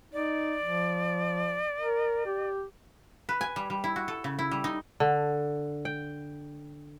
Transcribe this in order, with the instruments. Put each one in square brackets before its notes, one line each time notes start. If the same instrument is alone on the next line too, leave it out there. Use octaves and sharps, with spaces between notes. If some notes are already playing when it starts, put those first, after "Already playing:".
[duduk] D#4 [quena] D5
[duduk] F3
A#4
G4
[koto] B4
G#5
G3
G3
E4
F#4
A4
C#3
E4
G3
D#4
[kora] D3
G5